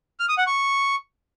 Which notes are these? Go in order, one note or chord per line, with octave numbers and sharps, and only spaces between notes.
F6
D#6
F#5
C#6